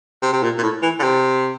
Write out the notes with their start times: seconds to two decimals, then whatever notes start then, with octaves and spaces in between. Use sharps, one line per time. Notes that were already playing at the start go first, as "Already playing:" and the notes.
0.22 C3
0.33 C3
0.43 A#2
0.58 A#2
0.63 A2
0.83 E3
0.99 D3
1.03 C3